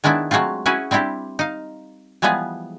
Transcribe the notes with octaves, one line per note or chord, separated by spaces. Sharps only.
D#3 G#3 B3 D4 E4
F#3 G#3 A3 C4 F4
C#4 E4 F#4 G#4 B4
G3 C4 D4 E4 G4
D#4 F5
E3 F3 G3 G#3 B3 G#4